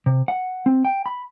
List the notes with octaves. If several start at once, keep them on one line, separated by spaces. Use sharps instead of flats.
C3
F#5
C4
G5
B5